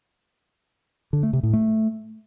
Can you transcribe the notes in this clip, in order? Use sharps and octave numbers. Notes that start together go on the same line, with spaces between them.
D3
A3
C3
A2
A3